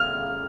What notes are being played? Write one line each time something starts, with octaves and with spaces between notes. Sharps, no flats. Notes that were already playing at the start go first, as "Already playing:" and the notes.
Already playing: F6